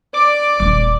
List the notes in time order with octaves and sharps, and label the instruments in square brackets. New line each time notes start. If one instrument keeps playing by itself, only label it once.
[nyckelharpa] D5 [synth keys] D6
[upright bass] D#1 B3 [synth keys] D6